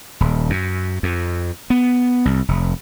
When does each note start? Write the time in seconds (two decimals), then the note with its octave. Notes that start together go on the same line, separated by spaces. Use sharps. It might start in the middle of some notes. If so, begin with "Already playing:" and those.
0.20 D#1
0.50 F#2
1.03 F2
1.70 B3
2.25 C2
2.48 F1